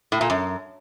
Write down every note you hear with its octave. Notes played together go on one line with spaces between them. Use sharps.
A2
A#2
F#2